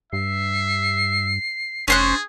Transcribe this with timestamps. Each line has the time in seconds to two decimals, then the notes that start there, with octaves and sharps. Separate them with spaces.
0.13 G2 E5 C7
1.88 F1 C#4 G#4 C5 F#6 A6